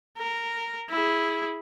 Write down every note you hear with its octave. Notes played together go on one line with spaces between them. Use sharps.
A#4
E4 G#4